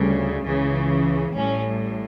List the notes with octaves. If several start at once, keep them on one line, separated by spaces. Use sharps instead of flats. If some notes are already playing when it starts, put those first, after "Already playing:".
Already playing: D2 C#3 G3
C#2 C#3 E3
A1 A2 G3 C#4